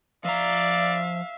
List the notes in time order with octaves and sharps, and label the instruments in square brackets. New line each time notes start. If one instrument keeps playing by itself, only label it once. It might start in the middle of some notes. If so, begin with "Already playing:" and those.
[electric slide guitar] F3 A#5 [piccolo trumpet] D5 [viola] E5 [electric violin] F5